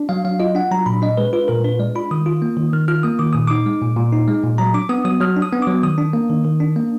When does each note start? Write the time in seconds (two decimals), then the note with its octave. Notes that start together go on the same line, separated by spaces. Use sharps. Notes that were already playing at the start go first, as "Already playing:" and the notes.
Already playing: D4
0.09 F#3 F5
0.25 F#3 F5
0.40 F4 D#5
0.55 D4 F#5
0.71 F#3 A#5
0.86 A#2 B5
1.02 D4 D#5
1.17 G#3 B4
1.33 F4 B4
1.48 A#2 A#4
1.64 D4 B4
1.79 G#3 D5
1.95 F4 B5
2.11 D#3 D#6
2.26 F4
2.42 A#3
2.57 D#3
2.73 D#3 F6
2.88 F4 F6
3.03 A#3 D#6
3.19 D#3 D6
3.33 A#2 D#6
3.47 D#4 D6
3.66 G#3
3.82 A#2
3.97 A#2
4.12 D#4
4.28 G#3
4.43 A#2
4.58 F#3 A#5
4.74 D4 D6
4.89 B3 D#6
5.05 F#3 D#6
5.20 F#3 F6
5.36 D4
5.42 D#6
5.53 B3
5.62 F#3 D6
5.83 D#3 D#6
5.98 D4
6.13 A#3
6.30 D#3
6.45 D#3
6.60 D4
6.76 A#3